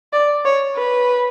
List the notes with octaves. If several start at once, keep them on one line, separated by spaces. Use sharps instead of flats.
D5
C#5
B4